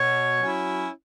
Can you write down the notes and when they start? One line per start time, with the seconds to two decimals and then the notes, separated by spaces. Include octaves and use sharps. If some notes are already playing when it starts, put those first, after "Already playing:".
Already playing: B2 C#5
0.41 F#3 C#4 E4